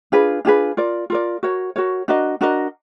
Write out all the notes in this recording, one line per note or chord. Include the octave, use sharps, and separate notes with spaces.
D4 F4 G#4 B4
D4 F4 G#4 B4
F4 A#4 D5
F4 A#4 D5
F#4 A#4 C#5
F#4 A#4 C#5
D4 F#4 A#4 D#5
D4 F#4 A#4 D#5